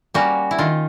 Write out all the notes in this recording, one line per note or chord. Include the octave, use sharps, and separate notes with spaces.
G3 A#3 C#4 F#4
E4
D#3 F4